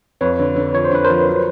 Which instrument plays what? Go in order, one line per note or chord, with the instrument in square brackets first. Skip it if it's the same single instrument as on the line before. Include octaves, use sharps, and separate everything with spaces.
[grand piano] F2 [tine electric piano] B4 C#5
[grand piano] D3
D3
[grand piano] F3 [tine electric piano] C#5
[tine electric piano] C5
[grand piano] D3 [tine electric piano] B4
[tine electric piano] A#4 C5
[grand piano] F3
F#3